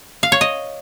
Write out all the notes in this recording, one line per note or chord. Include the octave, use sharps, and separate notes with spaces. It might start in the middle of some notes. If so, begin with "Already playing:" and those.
F5
C#5
D#5